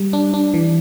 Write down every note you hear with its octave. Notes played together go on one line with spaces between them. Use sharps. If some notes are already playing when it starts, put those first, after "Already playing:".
Already playing: G3
D4
D4
E3